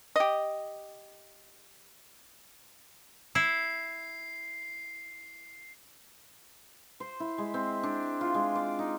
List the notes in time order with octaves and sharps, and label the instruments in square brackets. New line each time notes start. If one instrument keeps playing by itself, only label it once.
[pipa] G4 D#5
[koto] E4 [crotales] C7
[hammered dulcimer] C5
E4
G#3
C4
D4
F4
G#3
D5
D#4